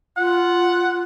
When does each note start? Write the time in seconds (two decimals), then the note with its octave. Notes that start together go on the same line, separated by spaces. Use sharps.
0.17 F4 F#5